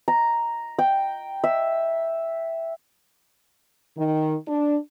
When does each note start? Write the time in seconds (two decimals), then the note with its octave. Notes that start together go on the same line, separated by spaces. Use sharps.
0.08 A#5
0.79 G5
1.44 E5
3.97 D#3
4.48 D4